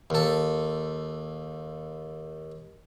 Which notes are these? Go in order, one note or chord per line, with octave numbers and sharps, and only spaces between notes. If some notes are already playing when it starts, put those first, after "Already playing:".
D#2 A4